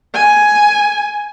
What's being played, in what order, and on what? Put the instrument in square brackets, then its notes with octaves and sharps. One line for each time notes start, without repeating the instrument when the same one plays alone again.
[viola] G#5